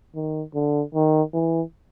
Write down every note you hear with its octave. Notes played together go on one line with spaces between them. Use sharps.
D#3
D3
D#3
E3